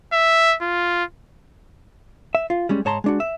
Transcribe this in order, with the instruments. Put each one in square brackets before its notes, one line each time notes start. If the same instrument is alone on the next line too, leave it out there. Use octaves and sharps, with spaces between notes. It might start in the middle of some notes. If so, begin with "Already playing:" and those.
[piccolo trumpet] E5
F4
[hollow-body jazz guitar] E5
F4
G3 G#3 C#4
G#2 C#5 A5 A#5 C6
G#3 D4 F#4
E5